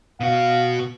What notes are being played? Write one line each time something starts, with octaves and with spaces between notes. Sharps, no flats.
B2 F#4 F5